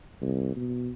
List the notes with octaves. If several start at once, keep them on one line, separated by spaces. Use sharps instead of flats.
C2
B2